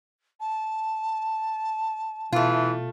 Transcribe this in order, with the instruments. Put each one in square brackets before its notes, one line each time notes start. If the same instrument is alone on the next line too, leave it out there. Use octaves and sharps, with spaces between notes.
[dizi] A5
[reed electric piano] B2 [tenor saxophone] E3 [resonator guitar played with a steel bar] A3 F4